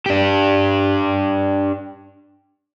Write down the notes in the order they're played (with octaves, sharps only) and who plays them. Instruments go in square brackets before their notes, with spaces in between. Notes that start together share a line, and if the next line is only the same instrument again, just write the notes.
[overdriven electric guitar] D4 G4